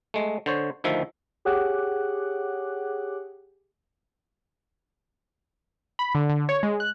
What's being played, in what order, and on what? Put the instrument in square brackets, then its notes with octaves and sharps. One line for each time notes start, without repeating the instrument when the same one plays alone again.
[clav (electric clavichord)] G#3 A3
D3 C5 C#5
D2 D#3 F3 E5
[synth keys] G4 G#4 C#5 F#5 D6 F#6
B5
D3
D3
C#5
G#3
F#6